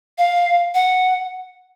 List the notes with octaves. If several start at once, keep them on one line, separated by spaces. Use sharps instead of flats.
F5
F#5